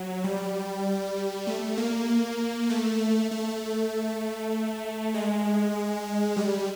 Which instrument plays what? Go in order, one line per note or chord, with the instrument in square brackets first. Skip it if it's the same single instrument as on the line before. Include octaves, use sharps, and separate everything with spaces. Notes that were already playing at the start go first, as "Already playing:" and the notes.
Already playing: [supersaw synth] F#3
G3
A3
A#3
A3
A3
G#3
G3